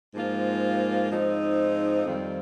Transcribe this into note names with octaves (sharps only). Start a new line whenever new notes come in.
G#2 F3 A#3 F4
G#2 F3 C4 D#4
F2 D#3 G3 C4 F4